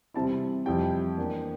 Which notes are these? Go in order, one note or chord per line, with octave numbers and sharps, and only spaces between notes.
E2 C3 G3 C4 E4 A5
F2 C3 E3 G3 G5
E2 E3 A#3 D4